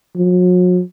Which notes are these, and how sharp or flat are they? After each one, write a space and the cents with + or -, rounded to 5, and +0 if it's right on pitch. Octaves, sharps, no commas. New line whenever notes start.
F#3 -40